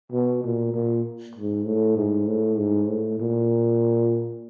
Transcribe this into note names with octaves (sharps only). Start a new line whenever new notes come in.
B2
A#2
A#2
G#2
A2
G#2
A2
G#2
A2
A#2